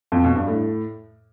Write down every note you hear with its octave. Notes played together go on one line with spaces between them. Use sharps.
F2
B2
G2
A2